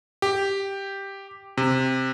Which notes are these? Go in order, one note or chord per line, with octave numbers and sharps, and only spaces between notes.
G4
C3